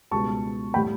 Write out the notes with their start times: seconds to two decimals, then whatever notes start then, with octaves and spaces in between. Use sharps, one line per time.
0.11 C#2 B2 G3 A5 C#6
0.74 A2 G3 G5 B5